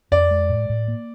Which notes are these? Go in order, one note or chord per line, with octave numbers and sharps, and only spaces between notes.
F2 D5
G#3
A2
A2
A#3